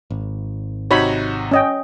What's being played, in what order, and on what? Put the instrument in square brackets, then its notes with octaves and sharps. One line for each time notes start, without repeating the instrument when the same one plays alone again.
[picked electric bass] G#1
[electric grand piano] C3 D#4 F#4 [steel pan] C#5 B5
[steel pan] C#4 D#5 G5